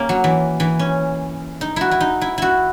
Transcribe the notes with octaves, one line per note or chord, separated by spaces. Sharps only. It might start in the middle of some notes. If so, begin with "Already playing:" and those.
Already playing: A#3 C#4
F#3
E3
E3
C#4
D#4
E4 F#4
E4
D#4
E4
E4 F#4